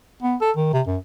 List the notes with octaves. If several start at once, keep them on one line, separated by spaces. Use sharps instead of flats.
B3
A4
D#3
C3
F#2